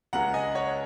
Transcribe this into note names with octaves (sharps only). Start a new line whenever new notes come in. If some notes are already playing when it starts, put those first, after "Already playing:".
C#2 C#3 G#3 F#5 A#5
D#5 G#5
C#5 F#5